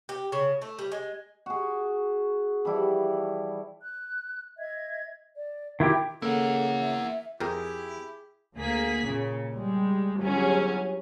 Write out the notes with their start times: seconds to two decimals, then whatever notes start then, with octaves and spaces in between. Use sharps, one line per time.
0.09 G4
0.32 C#3
0.62 A3
0.78 G3
0.92 G#3
1.46 F#4 G#4
2.65 E3 F3 G3 E4
3.81 F#6
4.58 D#5 E5 G#6
5.37 D5
5.80 D#3 E4 F#4 G4 G5
6.22 C#3 A#3 E4 A4 F#5
6.81 E5
7.40 F2 E4 G4 G#4 A#4 G5
8.56 D2 A#3 G#4 B6
9.04 A#2 C#3
9.54 G3 G#3
10.21 G1 F#3 C#4 G#4